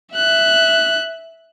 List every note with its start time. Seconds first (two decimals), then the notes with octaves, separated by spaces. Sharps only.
0.15 E5 F#6